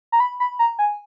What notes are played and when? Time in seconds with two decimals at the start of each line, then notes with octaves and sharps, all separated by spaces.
0.12 A#5
0.20 B5
0.40 B5
0.59 A#5
0.79 G#5